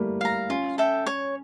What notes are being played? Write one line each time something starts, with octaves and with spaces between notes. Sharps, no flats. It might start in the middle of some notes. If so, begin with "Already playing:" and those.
Already playing: G3 A3 A#3 E4
F5 A#5
C#4 F4
A4 E5 G5
C#5